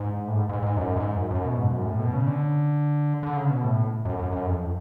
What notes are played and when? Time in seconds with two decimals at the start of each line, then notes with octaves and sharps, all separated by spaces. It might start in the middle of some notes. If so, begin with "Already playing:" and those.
Already playing: G#2
0.28 A2
0.35 G#2
0.49 G#2
0.62 G#2
0.77 F#2
0.96 G#2
1.17 F#2
1.31 F#2
1.45 B2
1.59 G#2
1.72 F#2
1.86 A2
2.00 B2
2.13 C#3
2.27 D3
3.23 D3
3.37 C#3
3.51 B2
3.64 A2
4.05 F#2
4.19 F#2
4.32 F#2
4.46 F2